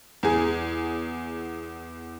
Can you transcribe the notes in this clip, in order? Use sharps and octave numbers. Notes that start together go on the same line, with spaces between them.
E2 G#4